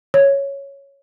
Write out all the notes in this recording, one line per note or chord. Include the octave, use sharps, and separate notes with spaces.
C#5